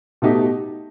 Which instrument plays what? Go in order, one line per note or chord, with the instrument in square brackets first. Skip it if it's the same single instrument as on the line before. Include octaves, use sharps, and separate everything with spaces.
[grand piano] B2 A3 D#4 G4